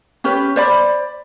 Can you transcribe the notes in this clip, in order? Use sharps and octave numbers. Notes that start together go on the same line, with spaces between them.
C#4 G4 B4
C5 D5 B5